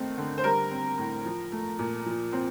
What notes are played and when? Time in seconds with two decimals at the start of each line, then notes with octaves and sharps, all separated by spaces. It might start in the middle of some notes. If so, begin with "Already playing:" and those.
Already playing: D#3 A3 C4
0.18 D3
0.38 C5
0.44 G3 A#4
0.71 C4
0.98 A2
1.26 F3
1.52 A3
1.79 A#2
2.06 F3
2.33 C4